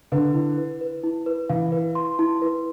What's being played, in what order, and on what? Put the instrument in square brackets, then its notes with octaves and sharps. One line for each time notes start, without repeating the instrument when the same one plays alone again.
[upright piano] D3 [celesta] B4
[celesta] E4
B4
B4
E4
B4
[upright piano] E3 [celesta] F5
[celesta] B4
C6
E4
B4